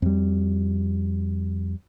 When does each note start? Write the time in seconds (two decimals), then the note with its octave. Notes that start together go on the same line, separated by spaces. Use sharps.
0.02 F2 G3